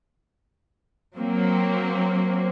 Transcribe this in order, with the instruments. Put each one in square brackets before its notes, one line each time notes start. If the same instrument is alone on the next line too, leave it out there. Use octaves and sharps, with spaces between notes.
[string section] F#3 A#3 C4